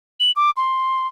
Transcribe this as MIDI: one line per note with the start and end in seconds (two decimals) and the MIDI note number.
0.20 0.31 102
0.36 0.50 86
0.57 1.07 84